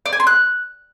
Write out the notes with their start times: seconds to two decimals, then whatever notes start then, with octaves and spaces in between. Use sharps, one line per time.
0.06 D5
0.13 G#5
0.20 C6
0.27 F#6